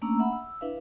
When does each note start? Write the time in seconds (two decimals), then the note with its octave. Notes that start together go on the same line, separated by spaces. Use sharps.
0.02 A3 A#3 C#4 D4 A#5 E6
0.19 E5 F#5 B5
0.33 E6
0.61 D4 E4 B4 E5 F5